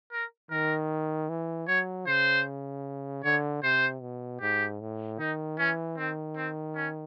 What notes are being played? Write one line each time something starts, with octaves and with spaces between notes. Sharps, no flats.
A#4
D#3 A#4
E3
F#3 C#5
C#3 C5
D3 C#5
C3 C5
B2
G#2 G4
A2
D#3 D#4
E3 C#4
D#3 C4
C4
C#4